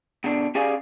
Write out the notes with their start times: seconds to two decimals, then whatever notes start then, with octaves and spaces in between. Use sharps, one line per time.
0.24 B2 D3 D4
0.55 C#4 G4 G#4 D5 F5 G#5